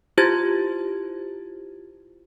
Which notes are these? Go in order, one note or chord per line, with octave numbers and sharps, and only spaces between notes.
E4 F4 G4 C5 G#6 A6